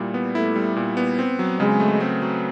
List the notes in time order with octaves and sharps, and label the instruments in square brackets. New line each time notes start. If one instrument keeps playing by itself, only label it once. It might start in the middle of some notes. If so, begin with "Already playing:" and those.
Already playing: [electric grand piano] A#2 G3 E4
B3
[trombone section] A3 [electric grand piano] E4
[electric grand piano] G3
A#2
B3
C4
F#3
[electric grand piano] C#3 [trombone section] G#3
[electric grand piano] A3
C4
F#3